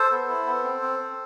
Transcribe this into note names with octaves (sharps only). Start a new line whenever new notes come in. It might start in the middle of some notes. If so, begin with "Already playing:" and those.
Already playing: A4 C5
B3
E4
B3
C4
C4
C4